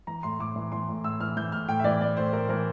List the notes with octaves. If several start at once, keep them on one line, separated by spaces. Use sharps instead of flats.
E3 A#5
A2 C6
A2 D6
E3
E3 C6
A2
A2 E6
E3 F6
E3 G6
A2 F6
A2 G5
E5
E3 D5
E3 D5
A2 C5
A2 A#4
E3 A#4